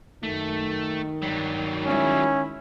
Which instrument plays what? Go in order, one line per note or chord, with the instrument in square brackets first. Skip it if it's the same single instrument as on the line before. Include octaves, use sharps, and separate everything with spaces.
[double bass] F#2 [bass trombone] D#3 [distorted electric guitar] A3
[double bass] G2 [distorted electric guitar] F#3 G3
[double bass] G#3 E4 [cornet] C#4